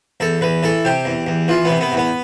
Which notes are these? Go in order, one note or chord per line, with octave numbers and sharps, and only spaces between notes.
E2 A4
E2 B4
E3 A4
C3 G4
E2
E2
E3 F4
C3 B3
B3
E2
B3